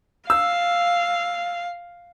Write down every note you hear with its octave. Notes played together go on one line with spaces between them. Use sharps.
F5 E6